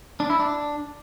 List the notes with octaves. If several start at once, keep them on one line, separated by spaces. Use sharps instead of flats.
D4
E4
D4